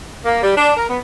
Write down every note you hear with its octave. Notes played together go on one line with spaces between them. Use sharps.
A#3
G3
D4
A#4
B3